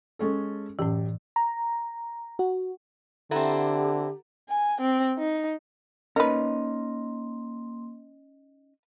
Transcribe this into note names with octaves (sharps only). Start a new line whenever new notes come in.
G#3 C#4 A4
F#2 A2 E3 G4
A#5
F#4
D3 C4 E4 G4 A4 F#5 A#5
G#5
C4
D#4
A#3 C#4 D#4 A#4 B4 D#5 C6